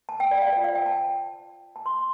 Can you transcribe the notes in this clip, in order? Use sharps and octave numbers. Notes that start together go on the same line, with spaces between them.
A5
G5
D5
F5
F4 C5 D5
F5
G5
A5
A5
C6